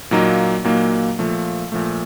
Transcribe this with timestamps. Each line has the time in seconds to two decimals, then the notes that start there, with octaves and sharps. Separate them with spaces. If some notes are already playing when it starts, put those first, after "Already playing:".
0.11 A#2 F#3 A#3 D#4
0.64 A#2 F#3 A#3 D#4
1.19 A#2 F3 A3
1.72 A#2 F3 A3